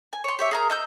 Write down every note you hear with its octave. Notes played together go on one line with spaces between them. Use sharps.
G#5
C#5 C6
G4 C#5 E5
G#4 A#4 A#5
D#5 E6 G6